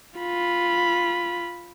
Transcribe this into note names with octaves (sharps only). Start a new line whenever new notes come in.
F4 B5